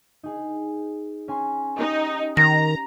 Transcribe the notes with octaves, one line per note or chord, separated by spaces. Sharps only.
D#4 G#4
C#4 G#5 C6
D#4 G4
D#3 A#5 A#6